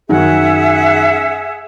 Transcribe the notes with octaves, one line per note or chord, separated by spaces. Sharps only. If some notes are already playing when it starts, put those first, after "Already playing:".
F#2 D#3 F#3 G#4 E5 F#5